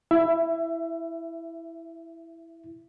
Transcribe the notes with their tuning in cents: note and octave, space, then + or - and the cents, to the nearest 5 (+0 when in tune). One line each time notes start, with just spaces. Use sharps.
E4 +0 E5 +25